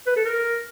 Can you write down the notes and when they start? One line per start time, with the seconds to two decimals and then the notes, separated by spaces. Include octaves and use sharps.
0.07 B4
0.16 A4
0.25 A#4